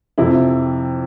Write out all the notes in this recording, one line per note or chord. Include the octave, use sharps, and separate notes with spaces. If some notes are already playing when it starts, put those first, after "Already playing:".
F2 C3 F3 E4